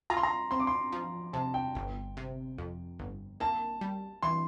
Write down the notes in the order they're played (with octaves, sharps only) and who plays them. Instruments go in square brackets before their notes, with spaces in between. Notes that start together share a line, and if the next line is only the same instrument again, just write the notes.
[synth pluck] F4 [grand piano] A#5
[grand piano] C6
A#5
[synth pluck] C4 [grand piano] C6
[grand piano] D6
C6
[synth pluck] F3
[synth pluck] C3 [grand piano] A5
[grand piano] G5
[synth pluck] G1
C3
F2
G1
[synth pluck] A#3 [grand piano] A5
[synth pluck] G3
[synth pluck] E3 [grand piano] C6